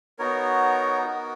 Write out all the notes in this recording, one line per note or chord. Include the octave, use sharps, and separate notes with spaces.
B3 D#4 F#4 A#4 C#5
F#4 A#4